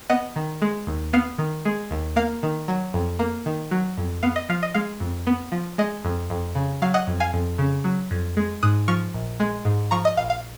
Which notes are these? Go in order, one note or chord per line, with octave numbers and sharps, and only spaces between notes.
B3 D#5 F#5
D#3
G#3
D#2
B3 F5
D#3
G#3
D#2
A#3 F5
D#3
F#3
F2
A#3
D#3
F#3
F2
B3 F5
D#5
F3 F5
D#5
G#3 F5
F2
B3
F3
G#3 D#5
F2
F2
C#3
F#3 F5
D#5 F#5
F2
F5 G#5
F2
C#3
F#3
F2
G#3
G#2 D#6 F#6
F3 C#6 F6
A#1
G#3
G#2
F3 A#5 C#6
D#5
A#1 F5
F5